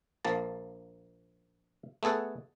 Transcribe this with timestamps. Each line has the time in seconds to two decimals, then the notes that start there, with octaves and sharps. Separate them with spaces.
0.25 A#1 F3 A#3 A5
2.03 A3 B3 G#4 A4 F#5